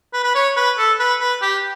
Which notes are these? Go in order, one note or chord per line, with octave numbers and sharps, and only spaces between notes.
B4
B4
C#5
B4
A4
B4
B4
G4